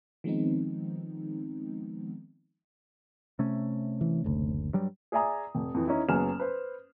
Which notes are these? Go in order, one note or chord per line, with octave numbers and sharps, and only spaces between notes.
D#3 F3 G#3 B3 C4 D#4
C3 A3 C#4
E3
F#1 D2
G2 F#3 G3
G#4 D5 E5 G#5 A#5 D#6
F1
F2 E3
E3 C#4 D#4 E4
F#1 F#3 B3 G#5 F6 E7
B4 C5